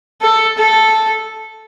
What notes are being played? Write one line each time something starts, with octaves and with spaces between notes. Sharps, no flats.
A4
A4